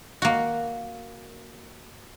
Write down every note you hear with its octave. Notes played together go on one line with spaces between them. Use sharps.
A#3 F#4